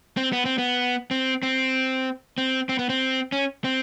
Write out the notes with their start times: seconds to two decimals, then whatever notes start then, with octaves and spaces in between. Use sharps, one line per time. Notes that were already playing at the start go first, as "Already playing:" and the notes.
0.17 C4
0.33 B3
0.45 C4
0.58 B3
1.11 C4
1.43 C4
2.38 C4
2.69 C4
2.79 B3
2.89 C4
3.32 C#4
3.64 C4